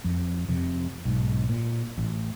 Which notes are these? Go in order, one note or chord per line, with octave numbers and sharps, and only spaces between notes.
F2
F2 C3
B1 G#2
A#2
A1